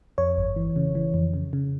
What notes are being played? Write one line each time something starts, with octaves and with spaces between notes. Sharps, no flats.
F2 C#5
G1
E3
C#3
E3
F2
C#3
C#3